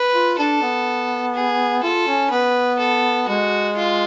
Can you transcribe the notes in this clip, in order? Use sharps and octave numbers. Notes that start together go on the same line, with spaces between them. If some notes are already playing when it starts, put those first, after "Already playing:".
Already playing: B4
F4
D4 A4
B3
G#4
F4 A4
C#4
B3 B4
A4
G#3 F#4
F4